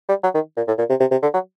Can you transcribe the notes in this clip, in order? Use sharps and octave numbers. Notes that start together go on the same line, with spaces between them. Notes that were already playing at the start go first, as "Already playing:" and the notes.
G3
F#3
D#3
A#2
A2
A#2
C3
C3
C3
D3
F#3